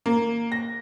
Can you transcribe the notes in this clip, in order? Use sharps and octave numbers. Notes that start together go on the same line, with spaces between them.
A#3
A#6